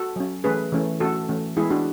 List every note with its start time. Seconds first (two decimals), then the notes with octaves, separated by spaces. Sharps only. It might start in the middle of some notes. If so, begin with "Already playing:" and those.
Already playing: F#4 A4
0.16 F#3 C#4
0.44 E3 A3 C#4 G#4 B4
0.72 E3 A3 C#4
1.00 E3 A3 C#4 F#4 A4
1.28 E3 A3 C#4
1.57 E3 G#3 B3 E4 G#4
1.70 D4 F#4